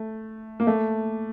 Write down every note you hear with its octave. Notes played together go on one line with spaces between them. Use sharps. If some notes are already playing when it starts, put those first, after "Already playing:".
Already playing: A3
A#3
A3